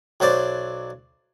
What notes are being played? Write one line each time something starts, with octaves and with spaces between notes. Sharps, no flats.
B1 F#3 C5 D5